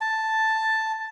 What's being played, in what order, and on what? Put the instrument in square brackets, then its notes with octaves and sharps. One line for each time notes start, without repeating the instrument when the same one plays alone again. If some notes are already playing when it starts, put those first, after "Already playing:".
[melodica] A5